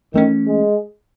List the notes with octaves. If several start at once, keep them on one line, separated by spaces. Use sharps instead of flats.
D#3 E3 A3 C#4
G#3